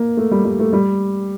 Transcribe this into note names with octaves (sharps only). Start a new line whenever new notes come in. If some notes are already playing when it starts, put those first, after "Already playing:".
Already playing: A#3
A3
G3
G3
A3
G3